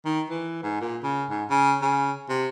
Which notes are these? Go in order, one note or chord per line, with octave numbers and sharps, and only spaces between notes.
D#3
E3
G#2
A#2
C#3
G#2
C#3
C#3
C3